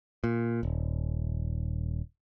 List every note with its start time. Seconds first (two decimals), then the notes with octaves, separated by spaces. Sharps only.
0.24 A#2
0.63 D#1